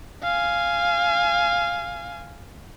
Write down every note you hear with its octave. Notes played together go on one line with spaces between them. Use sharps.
F5 G#5